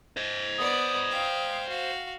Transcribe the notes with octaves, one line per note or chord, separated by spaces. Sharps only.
C5 D#5
B3 D5 D#6
F5 G5
F#4 F5